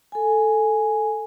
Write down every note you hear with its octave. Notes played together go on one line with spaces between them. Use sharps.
A4 G#5